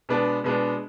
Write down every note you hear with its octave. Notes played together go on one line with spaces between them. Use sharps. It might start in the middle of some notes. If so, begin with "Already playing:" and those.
B2 G#3 B3 D4
B2 G#3 B3 D4